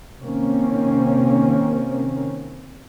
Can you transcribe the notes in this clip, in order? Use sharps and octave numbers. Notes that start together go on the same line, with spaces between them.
C3 D#3 A#3 C4 C#4